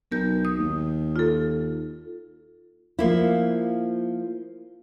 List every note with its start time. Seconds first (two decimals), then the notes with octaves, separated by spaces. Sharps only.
0.12 B1 A#4 G6
0.45 D#6
0.59 D#2
1.16 F4 A4
2.99 F3 A#3 E4